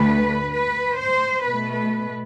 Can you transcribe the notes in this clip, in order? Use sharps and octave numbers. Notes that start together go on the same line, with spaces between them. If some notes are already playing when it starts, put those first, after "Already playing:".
Already playing: D2 D3 A3 B4
B4
C5
B2 A3 B4
B4